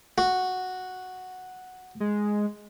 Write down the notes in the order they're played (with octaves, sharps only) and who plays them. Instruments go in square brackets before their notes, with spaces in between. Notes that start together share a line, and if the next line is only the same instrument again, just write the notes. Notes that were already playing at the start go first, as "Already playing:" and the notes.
[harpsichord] F#4
[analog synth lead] G#3